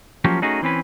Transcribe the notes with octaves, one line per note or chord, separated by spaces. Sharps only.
F3 F#3 A#3 C#4 G4
A3 C#4 D#4 F#4 G#4
E3 C4 C#4 B4